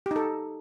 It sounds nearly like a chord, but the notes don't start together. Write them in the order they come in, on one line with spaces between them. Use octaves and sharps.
G4 D#4 A4